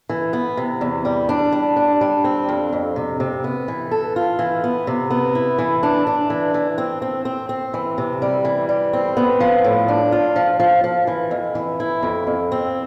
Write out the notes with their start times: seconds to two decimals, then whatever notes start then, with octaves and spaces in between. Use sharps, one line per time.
0.09 E3
0.33 B3
0.57 C3
0.81 E2
1.05 G3
1.29 D4
1.52 G3
1.76 D4
2.01 G3
2.24 C4
2.49 F2
2.73 F2
2.96 C3
3.20 C3
3.44 B3
3.68 E3
3.91 A4
4.16 F4
4.39 E3
4.64 B3
4.87 C3
5.10 B3
5.35 E4
5.58 E3
5.83 D4
6.07 D4
6.30 E3
6.54 E3
6.78 C4
7.02 C4
7.25 C4
7.49 C4
7.74 E3
7.98 C3
8.22 G3
8.45 E3
8.69 G3
8.93 C4
9.17 B3
9.40 F3
9.64 A2
9.88 D4
10.12 F4
10.36 F3
10.60 F3
10.84 F3
11.07 E3
11.31 F2
11.55 E3
11.80 E4
12.03 F2
12.27 F2
12.52 C4